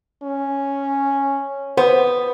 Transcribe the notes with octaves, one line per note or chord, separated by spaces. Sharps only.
C#4
B3 C5